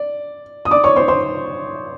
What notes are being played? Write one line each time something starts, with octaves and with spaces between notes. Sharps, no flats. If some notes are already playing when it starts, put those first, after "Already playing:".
Already playing: D5
D#6
D5 D6
C#5 C#6
C5 C6
C5 C6